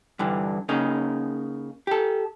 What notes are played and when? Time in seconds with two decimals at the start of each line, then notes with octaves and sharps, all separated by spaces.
0.19 G2 D3 E3
0.69 C#3 A#3 D#4
1.87 G4 A4